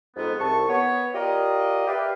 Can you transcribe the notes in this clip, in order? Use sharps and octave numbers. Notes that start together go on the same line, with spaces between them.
F2 G#2 B3
C2 A5 C#6
B3 C#5
F4 G4 A#4 D5 D#5
G4 B4 D5 E5 F5